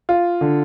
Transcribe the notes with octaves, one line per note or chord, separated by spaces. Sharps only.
F4
D3